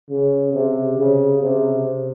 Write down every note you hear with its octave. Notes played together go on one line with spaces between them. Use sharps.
C#3
C3
C#3
C3